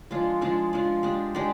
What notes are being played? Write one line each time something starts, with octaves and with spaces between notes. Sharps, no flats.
F3 G#3 D4 F4
F3 G#3 D4 F4
F3 G#3 D4 F4
G#3 D4 G4
G#3 D4 G4